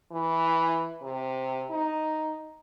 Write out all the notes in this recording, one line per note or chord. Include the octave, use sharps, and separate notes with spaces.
E3
C3
D#4